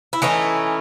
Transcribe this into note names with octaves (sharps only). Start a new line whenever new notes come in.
E4
E3 A3 C#4 D#4